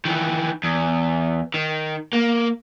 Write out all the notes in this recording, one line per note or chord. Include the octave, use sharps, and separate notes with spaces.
D#3 E3
E2
D#3
A#3